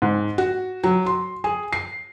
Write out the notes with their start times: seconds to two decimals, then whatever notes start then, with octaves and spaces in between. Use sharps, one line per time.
0.02 G#2
0.38 F#4
0.84 F#3
1.06 C6
1.44 G#4
1.73 C7